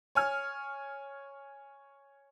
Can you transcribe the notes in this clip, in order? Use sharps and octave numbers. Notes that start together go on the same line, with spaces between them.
C#5 G#5 F6